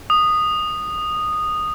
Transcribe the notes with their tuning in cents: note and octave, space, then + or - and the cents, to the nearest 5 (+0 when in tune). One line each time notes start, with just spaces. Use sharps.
D#6 -10